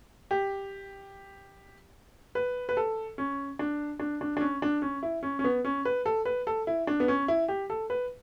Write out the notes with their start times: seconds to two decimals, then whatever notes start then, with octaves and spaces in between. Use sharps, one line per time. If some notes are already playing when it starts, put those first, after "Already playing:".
0.31 G4
2.35 B4
2.69 B4
2.77 A4
3.18 C#4
3.59 D4
3.99 D4
4.21 D4
4.37 D4
4.41 C#4
4.62 D4
4.82 C#4
5.03 E4
5.23 C#4
5.39 C#4
5.44 B3
5.65 C#4
5.85 B4
6.06 A4
6.25 B4
6.47 A4
6.67 E4
6.87 D4
7.00 B3
7.08 C#4
7.28 E4
7.48 G4
7.70 A4
7.90 B4